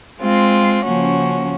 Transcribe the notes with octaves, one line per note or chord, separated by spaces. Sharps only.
G#3 C4 F4
C#3 F3 A#3 C#4 F#4